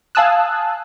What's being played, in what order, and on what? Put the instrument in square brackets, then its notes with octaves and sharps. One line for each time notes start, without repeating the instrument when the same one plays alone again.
[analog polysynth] F5 G#5 A5 D#6 E6 F#6